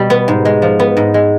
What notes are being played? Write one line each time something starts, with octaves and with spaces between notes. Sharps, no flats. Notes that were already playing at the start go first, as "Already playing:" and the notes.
Already playing: B2 G3
B3
G#2
G#3
F3
B3
G#2
G#3